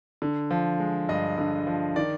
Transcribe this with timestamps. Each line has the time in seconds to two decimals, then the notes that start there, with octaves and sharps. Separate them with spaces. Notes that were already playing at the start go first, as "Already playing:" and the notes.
0.22 D3
0.51 F3
0.80 G#3
1.09 G2 D#5
1.38 D3
1.67 F3
1.96 D#3 D5